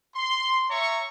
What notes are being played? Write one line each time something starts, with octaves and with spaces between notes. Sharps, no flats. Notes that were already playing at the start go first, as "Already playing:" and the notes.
C6
C#5 E5 A#5 C#6